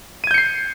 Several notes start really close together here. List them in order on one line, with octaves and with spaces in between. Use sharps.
D#7 G#6 G6 C#7 C7